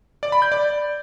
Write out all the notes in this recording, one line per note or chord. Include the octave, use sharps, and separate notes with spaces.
D5
B5
G6
D5